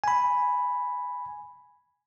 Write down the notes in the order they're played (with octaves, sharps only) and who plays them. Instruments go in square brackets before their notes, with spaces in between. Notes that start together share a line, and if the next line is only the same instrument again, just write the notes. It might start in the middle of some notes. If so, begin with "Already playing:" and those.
[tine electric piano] G#5 B5